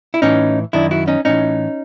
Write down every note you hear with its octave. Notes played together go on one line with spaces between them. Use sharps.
E4
A2 E3 C#4 D#4
F#2 D#3 D4 E4
E4 F#4
C#4 D#4
A2 E3 C#4 D#4